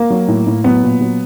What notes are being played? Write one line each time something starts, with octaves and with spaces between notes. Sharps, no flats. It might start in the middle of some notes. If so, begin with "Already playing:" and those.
Already playing: A#3
F#3
A2
A2
F#3 B3
A#2
F#3